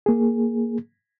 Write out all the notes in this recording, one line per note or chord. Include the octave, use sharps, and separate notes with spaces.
A#3 G#4